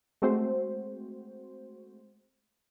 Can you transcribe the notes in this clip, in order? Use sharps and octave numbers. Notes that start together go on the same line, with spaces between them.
G#3 A3 C4 F#4 C5